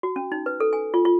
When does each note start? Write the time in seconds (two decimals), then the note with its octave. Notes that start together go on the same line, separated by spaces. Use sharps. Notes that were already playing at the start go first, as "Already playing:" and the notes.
0.03 F#4
0.16 C#4
0.32 D#4
0.46 B4
0.60 A4
0.73 G#5
0.94 F4
1.05 F4